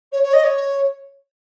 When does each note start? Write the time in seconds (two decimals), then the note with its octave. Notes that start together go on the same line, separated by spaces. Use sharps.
0.12 C#5
0.23 C#5
0.33 D#5
0.44 C#5